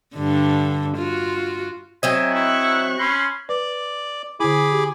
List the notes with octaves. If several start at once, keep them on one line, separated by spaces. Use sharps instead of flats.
G2 D3
F4 F#4
F#3 C4 D#5 E5 G#5
E4 C#6 F#6
C#4 B5 C6
B4 D5
D3 E4 G#4 B5 D6
G4